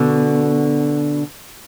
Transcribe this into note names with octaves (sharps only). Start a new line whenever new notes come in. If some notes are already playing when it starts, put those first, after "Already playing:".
Already playing: B2 D3